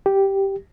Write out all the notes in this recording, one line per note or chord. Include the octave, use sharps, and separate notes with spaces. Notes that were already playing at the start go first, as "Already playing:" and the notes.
G4